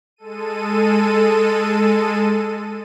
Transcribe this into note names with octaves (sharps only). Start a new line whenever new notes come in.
G#3 A4 D#7